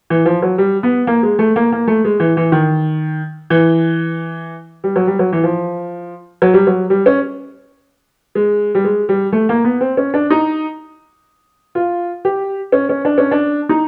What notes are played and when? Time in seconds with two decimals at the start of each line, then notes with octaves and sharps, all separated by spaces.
0.10 E3
0.25 F3
0.42 F#3
0.58 G3
0.83 B3
1.07 A#3
1.23 G#3
1.39 A3
1.56 A#3
1.72 A#3
1.87 A3
2.05 G#3
2.20 E3
2.37 E3
2.52 D#3
3.50 E3
4.84 G3
4.96 F#3
5.07 G3
5.19 F#3
5.33 E3
5.44 F3
6.42 F#3
6.54 G3
6.67 F#3
6.90 G3
7.06 C#4
8.35 G#3
8.75 G3
8.84 G#3
9.09 G3
9.32 A3
9.49 A#3
9.64 B3
9.81 C4
9.97 C#4
10.14 D4
10.30 D#4
11.75 F4
12.25 G4
12.72 C#4
12.89 C#4
13.05 D4
13.18 C#4
13.31 D4
13.69 D#4